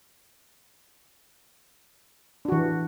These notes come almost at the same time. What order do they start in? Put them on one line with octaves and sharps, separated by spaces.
D4 F#4 E3